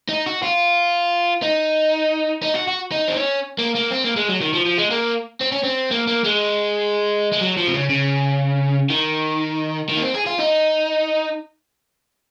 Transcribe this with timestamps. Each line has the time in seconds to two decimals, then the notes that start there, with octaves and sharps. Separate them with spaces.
0.09 D#4
0.26 F#4
0.43 F4
1.43 D#4
2.43 D#4
2.54 F#4
2.67 F#4
2.92 D#4
3.08 C4
3.16 C#4
3.58 A#3
3.75 A#3
3.91 C4
4.04 A#3
4.16 G#3
4.29 F#3
4.41 D#3
4.54 F3
4.66 F3
4.78 G#3
4.91 A#3
5.41 C4
5.52 C#4
5.63 C4
5.91 A#3
6.07 A#3
6.25 G#3
7.32 G#3
7.41 F#3
7.57 F3
7.67 C3
7.74 C#3
7.89 C#3
8.90 D#3
9.89 D#3
9.97 A#3
10.02 C4
10.15 G#4
10.27 F4
10.39 D#4